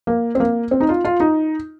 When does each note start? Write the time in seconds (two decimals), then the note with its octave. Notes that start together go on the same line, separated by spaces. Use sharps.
0.07 A#3
0.35 C4
0.40 A#3
0.71 C4
0.80 D#4
0.89 F4
1.05 F4
1.20 D#4